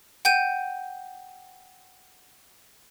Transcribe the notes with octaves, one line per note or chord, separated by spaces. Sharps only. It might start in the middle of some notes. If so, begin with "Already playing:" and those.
F#5 G5 G6 D#7